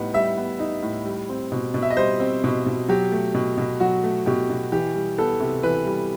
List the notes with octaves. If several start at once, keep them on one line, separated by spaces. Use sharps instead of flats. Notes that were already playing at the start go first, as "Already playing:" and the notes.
Already playing: A2 G3 B3 D#4
G3 E5
B3
D#4
A2
G3
C4
B2
B2
E5
D#5
G3 C5
C4
B2
B2
F#3 G4
A3
B2
B2
F#3 F#4
A3
B2 G4
B2
E3 G4
G3
B3 A4
C3
E3 B4
G3